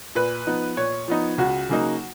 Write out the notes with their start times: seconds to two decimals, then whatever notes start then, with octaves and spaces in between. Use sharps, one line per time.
0.15 A#2 B4
0.47 F3 B3 D#4
0.77 A#2 C#5
1.08 F3 B3 D#4
1.38 C#2 F#4
1.69 C#3 F#3 A#3 D#4